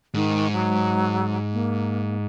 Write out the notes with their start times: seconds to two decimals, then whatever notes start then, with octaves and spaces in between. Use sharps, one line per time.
0.14 G#2 D#3
0.53 F#3
1.53 A#3